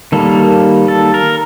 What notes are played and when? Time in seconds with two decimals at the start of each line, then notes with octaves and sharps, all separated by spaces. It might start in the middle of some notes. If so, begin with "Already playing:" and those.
0.12 D#3 G3 A#3 A4
0.88 A4
1.14 A#4